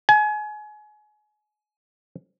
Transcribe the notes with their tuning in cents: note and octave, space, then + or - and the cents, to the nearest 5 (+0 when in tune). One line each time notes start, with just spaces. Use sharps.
G#5 +30